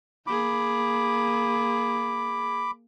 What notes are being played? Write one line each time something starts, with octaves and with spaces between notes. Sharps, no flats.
A#3 G#4 B5 D6